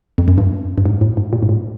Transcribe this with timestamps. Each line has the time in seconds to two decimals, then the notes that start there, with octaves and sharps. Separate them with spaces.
0.18 F2
0.28 F#2
0.38 G2
0.78 G2
0.85 G#2
1.01 A2
1.17 G#2
1.33 A#2
1.43 G#2
1.49 A2